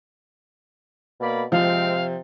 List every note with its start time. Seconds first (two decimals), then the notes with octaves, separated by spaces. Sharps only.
1.20 B2 A#3 D5 B5
1.52 C3 F3 G#3 C4 F5